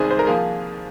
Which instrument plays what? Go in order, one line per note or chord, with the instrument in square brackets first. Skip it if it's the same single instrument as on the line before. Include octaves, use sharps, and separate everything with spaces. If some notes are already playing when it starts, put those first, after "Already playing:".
Already playing: [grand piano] C2 C3 D#3 G#3 G#4 C5
C5
A#4
F3 A#3 G#4